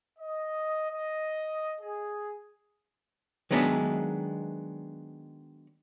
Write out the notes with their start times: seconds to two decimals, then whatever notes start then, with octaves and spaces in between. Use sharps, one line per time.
0.19 D#5
0.90 D#5
1.81 G#4
3.50 D#3 F#3 G#3 B3 D4 E5